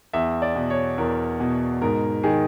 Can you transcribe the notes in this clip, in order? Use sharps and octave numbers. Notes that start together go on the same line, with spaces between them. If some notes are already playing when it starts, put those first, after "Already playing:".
E2 E5
D5
B2
C#5
E2 A#4
B2
G#2 A#4
D#3 G#4